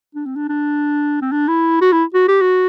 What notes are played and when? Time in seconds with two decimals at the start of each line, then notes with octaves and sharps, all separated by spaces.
0.15 D4
0.26 C4
0.36 D4
0.49 D4
1.22 C4
1.32 D4
1.48 E4
1.81 F#4
1.92 E4
2.14 F#4
2.28 G4
2.42 F#4